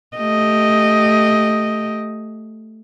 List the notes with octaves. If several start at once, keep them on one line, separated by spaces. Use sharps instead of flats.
A3 G4 D#5